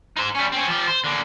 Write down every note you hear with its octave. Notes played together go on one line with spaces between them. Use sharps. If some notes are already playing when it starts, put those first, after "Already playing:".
D#4 C5
G3 C#4
C4 C#4
F3 G4
C5
D3 A#3